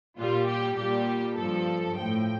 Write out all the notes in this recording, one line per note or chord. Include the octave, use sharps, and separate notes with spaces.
A#2 G3 F4
G4
A#2 G3 G4
G2 F3 A4
A2 F3 G5